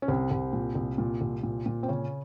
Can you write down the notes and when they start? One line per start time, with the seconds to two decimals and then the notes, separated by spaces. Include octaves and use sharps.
0.02 C#4
0.08 C2 C4
0.31 C2
0.53 A#2
0.75 C2
0.98 A#2
1.21 C2
1.43 A#2
1.66 A#2
1.83 C4
1.88 C#3 C#4